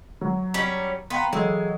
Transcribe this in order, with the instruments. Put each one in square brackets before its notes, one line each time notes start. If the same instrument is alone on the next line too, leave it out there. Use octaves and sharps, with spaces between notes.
[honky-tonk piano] F#3
[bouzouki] G3 C#4
[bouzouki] B3 [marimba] F5 G5 A#5 [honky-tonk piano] C6
[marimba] E3 A4 E6 [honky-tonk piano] F#3 [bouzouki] G#3